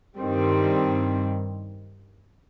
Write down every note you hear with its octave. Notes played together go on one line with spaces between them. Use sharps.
G2 D#3 G3 C4